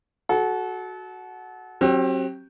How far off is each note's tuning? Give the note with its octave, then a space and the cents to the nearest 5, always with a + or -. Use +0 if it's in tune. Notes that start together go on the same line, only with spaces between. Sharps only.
F#4 +0 A4 -35
F#3 +0 C4 +35 G4 -5